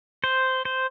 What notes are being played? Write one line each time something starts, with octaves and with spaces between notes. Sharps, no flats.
C5
C5